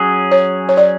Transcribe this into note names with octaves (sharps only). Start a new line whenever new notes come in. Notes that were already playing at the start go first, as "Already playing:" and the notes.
Already playing: F#3 C#4 G#4
C#5
C#5
D5